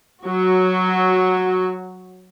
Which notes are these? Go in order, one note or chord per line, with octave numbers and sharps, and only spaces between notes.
F#3 F#4